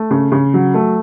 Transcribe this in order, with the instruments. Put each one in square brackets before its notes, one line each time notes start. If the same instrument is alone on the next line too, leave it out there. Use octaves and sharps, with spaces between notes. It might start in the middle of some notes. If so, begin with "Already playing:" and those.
Already playing: [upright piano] A3
C#3
C#3
F#3
A3